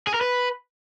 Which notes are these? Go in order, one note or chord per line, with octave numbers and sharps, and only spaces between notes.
G#4
A#4
B4